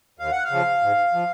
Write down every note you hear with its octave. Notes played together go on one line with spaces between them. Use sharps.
D#2 F5
F#5
F5
C#3 F3
G#2
F3